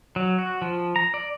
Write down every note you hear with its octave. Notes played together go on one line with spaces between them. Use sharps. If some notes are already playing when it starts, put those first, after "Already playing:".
F#3
F#4
F3
A#5
D5